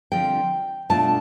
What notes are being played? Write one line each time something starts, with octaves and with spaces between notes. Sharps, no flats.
D3 F3 C4 F4 G5
B2 A3 D4 F4 A5